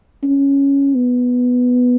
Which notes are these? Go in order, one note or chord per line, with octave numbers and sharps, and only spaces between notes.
C#4
B3